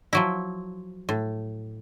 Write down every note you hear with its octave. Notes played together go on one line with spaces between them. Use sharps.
F3 F#3 E4
A2